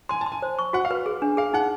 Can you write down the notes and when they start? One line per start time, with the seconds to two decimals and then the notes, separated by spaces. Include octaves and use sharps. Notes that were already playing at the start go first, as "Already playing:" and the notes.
0.09 G#5 C6
0.21 A5
0.26 C6
0.32 G#5
0.42 C5
0.59 C#6
0.73 F#4 F#5
0.85 F5
0.91 B4
1.06 G#4
1.22 D4
1.37 G#4 F5
1.53 D#4 F#5